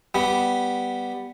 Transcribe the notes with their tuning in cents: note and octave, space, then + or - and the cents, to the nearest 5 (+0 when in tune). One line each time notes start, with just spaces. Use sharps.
G3 +0 B3 +0